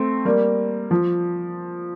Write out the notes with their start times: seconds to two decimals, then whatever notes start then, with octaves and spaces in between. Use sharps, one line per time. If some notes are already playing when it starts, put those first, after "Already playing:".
Already playing: A3 C4
0.25 G3 A#3
0.91 F3